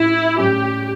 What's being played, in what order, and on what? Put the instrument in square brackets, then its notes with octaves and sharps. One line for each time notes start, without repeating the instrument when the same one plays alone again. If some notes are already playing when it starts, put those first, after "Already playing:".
Already playing: [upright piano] A2 G3 C#4 [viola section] E4
[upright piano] A2 G3 C#4 [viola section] G4